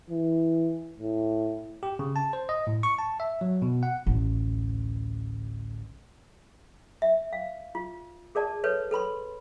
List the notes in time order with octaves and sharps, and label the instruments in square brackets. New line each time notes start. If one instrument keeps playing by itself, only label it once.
[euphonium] E3
A2
[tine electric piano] G4
C#3
A5
C5
D#5
A2
C#6
A5
E5
F#3
B2
F#5
[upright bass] A1 D2
[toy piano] E5
F5
F4
G#4 A#4 D5 A5
A4 B4 C#5
A4 B4 B5 C6